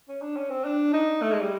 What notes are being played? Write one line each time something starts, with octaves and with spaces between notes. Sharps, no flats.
C#4
D4
C#4
C4
D4
D#4
A3
G#3
G3